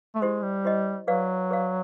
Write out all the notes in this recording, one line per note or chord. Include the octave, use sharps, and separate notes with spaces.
A3
G#3 E4 G4 C5 D#5
G3
E4 G4 C5 D#5
F#3 G#4 B4 D5 F5
G#4 B4 D5 F5